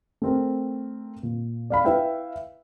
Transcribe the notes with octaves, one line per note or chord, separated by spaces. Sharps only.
A3 C4 A#4
A#2
D5 F5 B5
E4 B4 E5 F5 G5